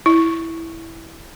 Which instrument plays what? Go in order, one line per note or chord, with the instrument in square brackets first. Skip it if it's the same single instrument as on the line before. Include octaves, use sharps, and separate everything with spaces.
[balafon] E4